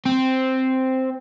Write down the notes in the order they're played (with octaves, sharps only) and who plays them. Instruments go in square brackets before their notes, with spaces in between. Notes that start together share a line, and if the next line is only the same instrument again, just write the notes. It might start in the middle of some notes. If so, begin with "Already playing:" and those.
[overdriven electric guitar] C4